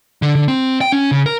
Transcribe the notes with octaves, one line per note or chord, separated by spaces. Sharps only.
D3
D3
C4
G5
C#4
C#3
A#4